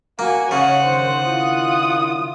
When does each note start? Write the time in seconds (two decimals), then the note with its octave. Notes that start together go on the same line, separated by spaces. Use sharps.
0.19 A#3 F#4 G#5
0.51 C#3 D#4 C#5 F5 F#5
0.84 F#2 D3 D#3 C5
1.25 D#3 D4 E4 F4 D#6